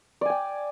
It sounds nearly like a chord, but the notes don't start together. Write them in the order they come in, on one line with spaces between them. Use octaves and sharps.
D5 G#5 G5